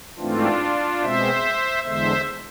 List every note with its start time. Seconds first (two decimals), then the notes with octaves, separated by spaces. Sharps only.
0.18 G#2 E3 A3 C4 D4 F4
1.01 B2 G#3 C4 C5 E5
1.83 E2 D3 G#3 C5 E5